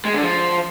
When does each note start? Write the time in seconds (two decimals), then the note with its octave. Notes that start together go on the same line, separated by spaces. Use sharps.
0.05 G#3
0.14 D3
0.23 F3